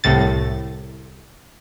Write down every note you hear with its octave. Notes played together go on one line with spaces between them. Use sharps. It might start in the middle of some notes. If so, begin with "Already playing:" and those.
C2 A2 A6